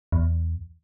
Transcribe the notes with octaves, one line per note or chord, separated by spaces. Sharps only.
E2